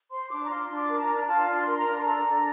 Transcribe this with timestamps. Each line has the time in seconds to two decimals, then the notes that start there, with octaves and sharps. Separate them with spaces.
0.10 C5 C6
0.30 D4 D6
0.44 A#5
0.49 F4 C6
0.68 D4
0.75 D6
0.88 A#4
0.97 A5
1.00 A#5
1.07 D4
1.21 A#5
1.26 F4 A5
1.46 D4
1.52 C6
1.65 A#4
1.78 A#5
1.84 D4
1.98 C6
2.04 A4 A#5
2.23 D4